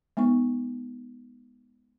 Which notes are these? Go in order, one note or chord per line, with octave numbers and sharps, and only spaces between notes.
G#3 B3 D#4 C#6